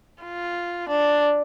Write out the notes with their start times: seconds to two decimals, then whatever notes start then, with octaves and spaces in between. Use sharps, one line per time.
0.23 F4
0.89 D4